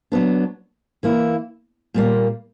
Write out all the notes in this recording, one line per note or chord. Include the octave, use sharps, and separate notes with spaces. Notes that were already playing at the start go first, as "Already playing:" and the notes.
F#3 B3 D4
E3 A#3 E4
A#2 G3 A#3